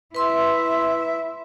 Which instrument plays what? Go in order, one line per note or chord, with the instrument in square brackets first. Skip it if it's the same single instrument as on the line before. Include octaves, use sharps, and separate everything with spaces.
[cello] E4 E5 [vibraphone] B4 C6 E6